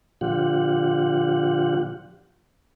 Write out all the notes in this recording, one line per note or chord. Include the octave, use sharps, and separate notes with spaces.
A#2 D3 F3 F4 G4 F#5